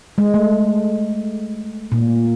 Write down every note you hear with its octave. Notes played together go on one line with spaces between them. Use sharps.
G#3
A3
A#2